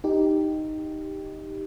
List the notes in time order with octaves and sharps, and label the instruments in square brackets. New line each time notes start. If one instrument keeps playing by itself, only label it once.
[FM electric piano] D#4 G4